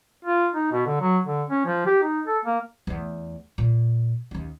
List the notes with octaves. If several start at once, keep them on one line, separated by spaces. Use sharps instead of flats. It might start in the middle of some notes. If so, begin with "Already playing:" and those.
F4
D#4
B2
D3
F#3
D3
C#4
F3
G4
D#4
A4
A#3
E2 A3
A#2
D#2 C#4